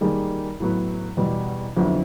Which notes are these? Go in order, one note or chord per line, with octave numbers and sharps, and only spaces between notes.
D#3 G3 A#3 D#4 G#4
A2 F#3 B3
E2 B2 G3
F2 D3 F#3 B3 E4